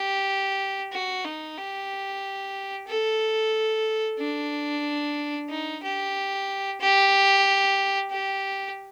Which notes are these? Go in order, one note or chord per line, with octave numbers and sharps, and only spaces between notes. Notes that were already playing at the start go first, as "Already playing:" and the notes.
Already playing: G4
F#4
D#4
G4
A4
D4
D#4
G4
G4
G4